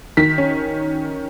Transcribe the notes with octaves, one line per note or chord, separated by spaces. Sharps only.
D#3 B6
C#4